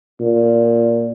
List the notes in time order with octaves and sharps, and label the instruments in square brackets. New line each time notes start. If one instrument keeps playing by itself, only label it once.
[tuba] A#2